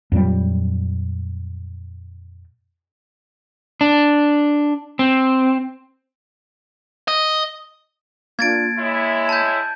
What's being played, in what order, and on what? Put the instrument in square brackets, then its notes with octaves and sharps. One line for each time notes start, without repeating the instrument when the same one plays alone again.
[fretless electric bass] F2 A#2 F#3 G3
[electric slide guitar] D4
C4
[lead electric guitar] D#5
[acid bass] A#3 [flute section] D4 F4 D5 [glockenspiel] G#6 A6 D7
[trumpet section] G#3 E4 [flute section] C#5 E5
[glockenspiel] A5 G6